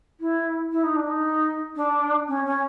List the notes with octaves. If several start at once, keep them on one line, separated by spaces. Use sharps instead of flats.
E4
E4
D#4
D4
D#4
D4
C#4
C#4